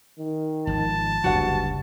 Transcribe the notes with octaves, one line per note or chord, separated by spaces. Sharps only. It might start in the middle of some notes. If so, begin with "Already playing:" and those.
D#3
G#1 F3 A5
F#1 D2 G2 C3 F#4 F#5